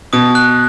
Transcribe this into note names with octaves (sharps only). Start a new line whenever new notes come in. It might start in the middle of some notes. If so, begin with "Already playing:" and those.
B2 D#6
F#6